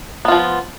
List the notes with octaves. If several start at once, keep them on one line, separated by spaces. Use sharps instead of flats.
F3 B3 F4